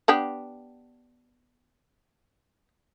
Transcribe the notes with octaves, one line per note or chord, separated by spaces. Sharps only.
B3 D4 G4